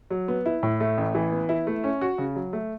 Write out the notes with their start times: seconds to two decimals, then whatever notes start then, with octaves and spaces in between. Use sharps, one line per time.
0.10 F#3
0.28 B3
0.46 E4
0.63 A2
0.80 A3
0.98 A1
1.15 E3
1.32 B3
1.49 E4
1.67 A3
1.84 C#4
2.01 F#4
2.18 C#3
2.36 F#3
2.53 A3